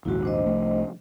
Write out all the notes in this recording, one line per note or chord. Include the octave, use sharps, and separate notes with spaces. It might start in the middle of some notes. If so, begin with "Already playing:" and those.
A#1 D#2 G#2 E4 F#4
D4 C5 D#5
C2 F3 A3